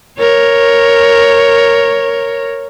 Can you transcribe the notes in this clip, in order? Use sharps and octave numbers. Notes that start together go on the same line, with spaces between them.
A#4 C#5